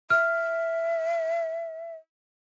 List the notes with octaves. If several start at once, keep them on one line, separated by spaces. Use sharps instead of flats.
E5 F6